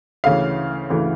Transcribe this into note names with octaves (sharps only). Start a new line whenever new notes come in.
D2 C#3 E3 F5
D2 C#3 E3